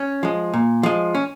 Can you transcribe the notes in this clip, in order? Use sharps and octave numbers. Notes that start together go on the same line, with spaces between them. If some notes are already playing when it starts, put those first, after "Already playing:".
Already playing: C#4
F3 G#3
A#2
F3 G#3
C#4